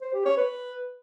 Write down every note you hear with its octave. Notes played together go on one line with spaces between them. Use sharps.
C5
G4
C#5
B4